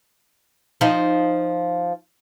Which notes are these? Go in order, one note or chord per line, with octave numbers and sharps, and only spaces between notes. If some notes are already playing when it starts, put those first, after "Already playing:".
F3 D#4